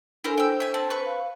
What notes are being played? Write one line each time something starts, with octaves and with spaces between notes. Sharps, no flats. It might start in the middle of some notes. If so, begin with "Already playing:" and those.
D4 E4 A4 A#4 C5 G#5
C5 G5 E6
E5 G#5
C4 A5
B4 C#6
F5